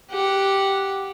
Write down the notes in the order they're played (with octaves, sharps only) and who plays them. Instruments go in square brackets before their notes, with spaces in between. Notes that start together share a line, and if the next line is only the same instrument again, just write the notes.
[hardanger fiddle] G4 F#5